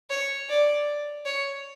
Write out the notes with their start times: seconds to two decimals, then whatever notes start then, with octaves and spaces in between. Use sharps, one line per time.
0.10 C#5
0.49 D5
1.26 C#5